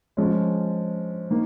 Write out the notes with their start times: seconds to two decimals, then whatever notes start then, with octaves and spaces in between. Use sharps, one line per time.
0.17 F3 G#3 C#4
1.31 D#3 A#3